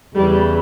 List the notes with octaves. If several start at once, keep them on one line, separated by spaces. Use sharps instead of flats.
E2 C#3 E3 G3